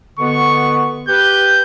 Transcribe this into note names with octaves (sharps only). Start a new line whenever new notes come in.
B2 D3 B3 C#6
G4 B4 G6